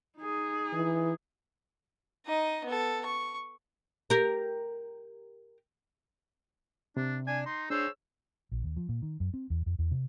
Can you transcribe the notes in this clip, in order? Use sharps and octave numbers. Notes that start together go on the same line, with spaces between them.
D#4 G#4
E3
D#4 D#5
B3 A4
C#6
G4 A#4
C3 D4
D4 G#5
D#4 C6
D4 G#4 C5 C#5 E6
A#1
D#2
F3
A#2
D#3
F#2
C4
E2
F2
E2
C3